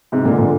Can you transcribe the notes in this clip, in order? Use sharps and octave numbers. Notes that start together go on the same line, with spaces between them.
G#2 C3
A#2 D3
A#2 D3